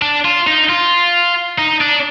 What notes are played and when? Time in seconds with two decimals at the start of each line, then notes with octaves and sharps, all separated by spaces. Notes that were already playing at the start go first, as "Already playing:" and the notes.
0.02 D4
0.25 F4
0.47 D#4
0.69 F4
1.59 D#4
1.81 D4